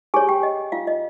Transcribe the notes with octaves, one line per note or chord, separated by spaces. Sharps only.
G4 G#4 C#5 G#5
G4 G5
D#5
F4 F5
D#5